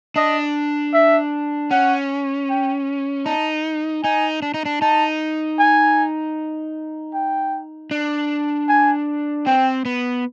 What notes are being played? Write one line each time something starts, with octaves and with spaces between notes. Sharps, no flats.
D4 D#5
E5
C#4 F#5
G5
D#4 A5
D#4 G#5
D4
D#4
D4
D#4 A5
G#5
G5
D4
G#5
C4 G5
B3